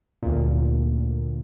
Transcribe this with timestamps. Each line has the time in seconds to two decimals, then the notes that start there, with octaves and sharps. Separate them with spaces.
0.23 D2 A#2